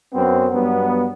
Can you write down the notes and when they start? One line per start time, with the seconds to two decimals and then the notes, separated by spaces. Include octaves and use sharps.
0.14 F#2 B3 C4
0.53 G2 F#3 B3